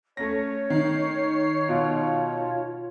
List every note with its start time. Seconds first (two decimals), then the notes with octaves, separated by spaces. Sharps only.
0.17 A3 C#4 C#5 A#6
0.70 D#3 C7
1.69 B2 F4